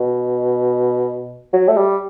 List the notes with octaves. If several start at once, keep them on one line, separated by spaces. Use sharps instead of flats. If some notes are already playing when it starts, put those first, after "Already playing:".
Already playing: B2
F#3
A3
G3